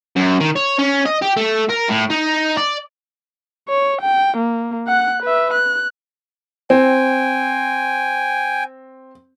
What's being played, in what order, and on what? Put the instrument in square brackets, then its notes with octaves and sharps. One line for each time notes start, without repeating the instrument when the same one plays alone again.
[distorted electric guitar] F#2
D#3
C#5
C#4
D#5
G4
A3
A#4
A2
D#4
D5
[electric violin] C#5
G5
A#3
F#5 F#6
B4 E5
F#6
[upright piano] C4 [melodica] G5 G#5